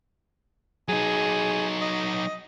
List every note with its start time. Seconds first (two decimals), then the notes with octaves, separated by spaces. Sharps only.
0.88 F#3 D#4 G#4
1.82 D#5